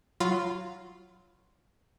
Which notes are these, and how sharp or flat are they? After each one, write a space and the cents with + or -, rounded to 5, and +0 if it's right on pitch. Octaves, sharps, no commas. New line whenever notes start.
F#3 +0 F4 +0 B5 +25